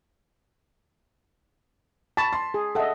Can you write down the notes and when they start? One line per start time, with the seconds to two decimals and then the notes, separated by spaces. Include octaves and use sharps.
2.17 A5 B5 C#6 B6
2.33 C6
2.54 G#4
2.75 A4 D#5 E5 F#5